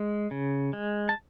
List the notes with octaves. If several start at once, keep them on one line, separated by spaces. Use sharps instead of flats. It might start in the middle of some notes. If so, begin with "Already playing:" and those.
Already playing: G#3
C#3
G#3
A5